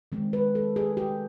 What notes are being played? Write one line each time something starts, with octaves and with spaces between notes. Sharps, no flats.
D#3 G#3 C4
B4
A4
G#4
G4